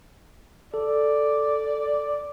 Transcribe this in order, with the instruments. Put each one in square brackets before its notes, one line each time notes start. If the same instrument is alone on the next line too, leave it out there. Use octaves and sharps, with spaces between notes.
[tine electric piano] A4 [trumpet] D5